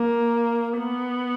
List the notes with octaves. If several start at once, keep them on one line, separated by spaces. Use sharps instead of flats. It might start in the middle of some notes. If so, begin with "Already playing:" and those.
Already playing: A#3
B3